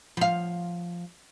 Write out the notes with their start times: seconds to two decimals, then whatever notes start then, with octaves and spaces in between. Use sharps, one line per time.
0.17 F3 F5